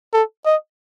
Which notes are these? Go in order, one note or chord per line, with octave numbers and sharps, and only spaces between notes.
A4
D#5